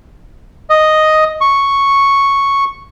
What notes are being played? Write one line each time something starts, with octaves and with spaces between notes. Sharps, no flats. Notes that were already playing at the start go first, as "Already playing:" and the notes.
D#5
C#6